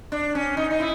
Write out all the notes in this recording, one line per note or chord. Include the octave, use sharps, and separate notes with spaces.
D4
C#4
D#4
D#4
E4